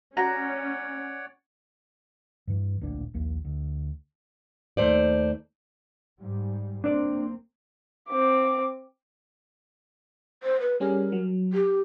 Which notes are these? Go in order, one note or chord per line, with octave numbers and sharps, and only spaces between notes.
C#4 F#4 C#5 D5 F#5 A#5
G2 E3
D1 A#1 D4
A#1 D#2
D2
D#2 A3 C5 D5
G#2 G3
F#1 A#3 C4 D4 D5
C4 D6
C5
B4
G3 C#4 G#4 A#4
F#3
G4